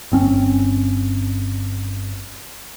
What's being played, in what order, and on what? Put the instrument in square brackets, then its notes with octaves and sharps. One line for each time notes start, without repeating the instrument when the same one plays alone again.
[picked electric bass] G1 C4 C#4